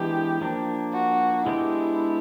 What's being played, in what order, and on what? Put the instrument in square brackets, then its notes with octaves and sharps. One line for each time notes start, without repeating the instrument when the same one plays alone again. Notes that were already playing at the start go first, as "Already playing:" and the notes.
Already playing: [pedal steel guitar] E3 G#3 B3 D4 [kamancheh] G4
[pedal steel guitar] F3 A#3 D4
[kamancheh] F#4
[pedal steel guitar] G#3 B3 D4 G4 [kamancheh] E4